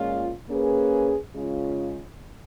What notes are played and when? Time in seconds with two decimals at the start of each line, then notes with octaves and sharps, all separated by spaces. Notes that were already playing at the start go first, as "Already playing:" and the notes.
Already playing: A#2 G#3 C#4 F4
0.48 A#3 C#4 G#4 B4
1.34 C#3 G#3 C#4 F4